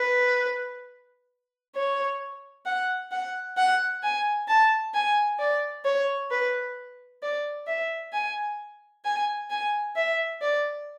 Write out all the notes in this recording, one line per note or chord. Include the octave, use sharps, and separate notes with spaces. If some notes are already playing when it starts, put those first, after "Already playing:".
Already playing: B4
C#5
F#5
F#5
F#5
G#5
A5
G#5
D5
C#5
B4
D5
E5
G#5
G#5
G#5
E5
D5